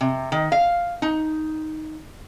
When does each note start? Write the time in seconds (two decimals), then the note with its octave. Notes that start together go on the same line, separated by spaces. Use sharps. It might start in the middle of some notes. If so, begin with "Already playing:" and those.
0.01 C3
0.32 D#3
0.52 F5
1.02 D#4